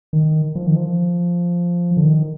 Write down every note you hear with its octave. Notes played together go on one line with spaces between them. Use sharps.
D#3
F3
D#3
F3
D3
D#3